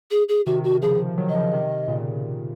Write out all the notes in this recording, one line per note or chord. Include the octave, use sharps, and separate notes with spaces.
G#4
G#4
C3 D#3 F#4
F#4
C#3 F3 G#4
D#3 F#3
D#5
C#3 F3
C3 D#3
A#2 C#3